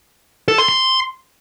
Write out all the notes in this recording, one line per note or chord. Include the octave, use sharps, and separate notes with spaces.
A4
C6
C6